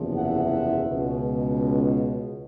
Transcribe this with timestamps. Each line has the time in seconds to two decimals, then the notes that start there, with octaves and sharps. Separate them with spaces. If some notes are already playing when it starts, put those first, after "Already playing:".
Already playing: F#1 E2 C3 F3
0.17 E5 F#5
0.87 C#2 B2